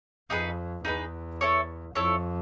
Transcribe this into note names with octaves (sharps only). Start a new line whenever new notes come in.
F2 D#4 G#4 B4
E2 D#4 G#4 B4
E4 A4 C#5
F2 E4 A4 C#5